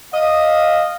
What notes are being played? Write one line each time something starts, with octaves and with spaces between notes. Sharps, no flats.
D#5 F5